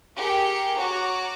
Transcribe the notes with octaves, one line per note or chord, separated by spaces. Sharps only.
G4 G#4 A#4 A#5 C#7
F#4 C#5 A#5 C#6 D6